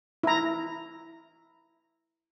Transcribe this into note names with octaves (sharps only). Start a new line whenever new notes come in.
E4 A#5